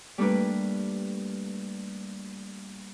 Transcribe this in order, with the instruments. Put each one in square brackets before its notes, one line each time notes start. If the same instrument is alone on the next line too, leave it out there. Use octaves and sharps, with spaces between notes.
[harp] G3 A3 A#3 D4 B4